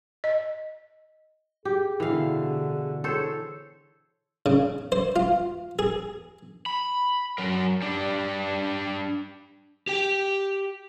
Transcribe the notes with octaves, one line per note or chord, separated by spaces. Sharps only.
D#5
G4 G#4
B2 D3 E3 F5
G#4 A4 C5 C#5
C#3
C5
F4
G#4
B5
F#3 A#4
G3 D4
G4 G5